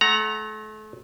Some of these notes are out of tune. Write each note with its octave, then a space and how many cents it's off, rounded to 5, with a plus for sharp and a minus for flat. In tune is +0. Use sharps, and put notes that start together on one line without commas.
A3 -35 F#5 +0 A#5 +0